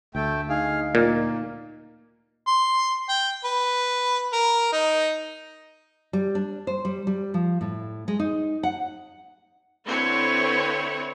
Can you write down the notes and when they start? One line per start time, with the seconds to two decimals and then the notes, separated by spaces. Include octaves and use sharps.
0.15 D2 A3 G5
0.49 D#4 G#4 F5
0.95 A#2 A#3
2.47 C6
3.09 G5
3.44 B4
4.33 A#4
4.72 D#4
6.13 G3
6.35 D4
6.67 C5
6.85 G3
7.07 G3
7.34 F3
7.61 A2
8.08 G#3
8.20 D#4
8.63 F#5
9.86 D3 C4 E4 B4 C#5